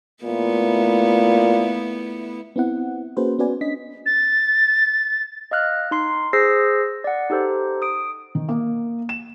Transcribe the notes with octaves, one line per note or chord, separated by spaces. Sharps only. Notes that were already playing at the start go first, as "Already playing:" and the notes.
A#2 A3 B3 E4
B3 C4 E4 F#5
A#3 C#4 F#4 G#4 B4 C5
B3 C#4 F#4 B4 D5 G#5
C#4 D4 D#5 B6
A6
D#5 F5 F6 F#6
D#4 C6 C7
G#4 C5 E6 A#6 C7
D5 F#5
D#4 G4 A4 C5
D#6 D7
D#3
A#3
E7